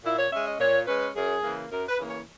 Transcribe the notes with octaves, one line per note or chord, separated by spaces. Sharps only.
A#2 E4
C#5
G#3 C#4 E5
D#5
A#2 C#5
G#3 C#4 B4
F#2 G#4
C#3 E3 A#3
F#2 A#4
B4
C#3 E3 A#3
C#5